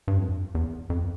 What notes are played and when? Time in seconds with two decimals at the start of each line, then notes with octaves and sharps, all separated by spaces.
0.08 G2
0.18 F2
0.55 E2
0.90 F2